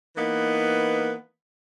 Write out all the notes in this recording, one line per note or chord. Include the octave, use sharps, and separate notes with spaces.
E3 A#3 B3 D#4